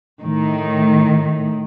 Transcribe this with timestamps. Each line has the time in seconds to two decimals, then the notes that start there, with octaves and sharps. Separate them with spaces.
0.22 A2 D#3